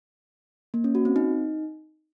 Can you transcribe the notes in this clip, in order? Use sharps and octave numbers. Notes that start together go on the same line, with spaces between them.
A#3
C#4
F#4
C4
D#4